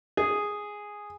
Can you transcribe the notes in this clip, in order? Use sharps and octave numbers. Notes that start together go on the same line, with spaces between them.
G#4